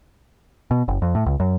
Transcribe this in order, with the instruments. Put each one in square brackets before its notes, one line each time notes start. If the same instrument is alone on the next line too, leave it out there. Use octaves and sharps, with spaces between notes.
[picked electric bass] B2
F#1
F2
A2
C#2
F#2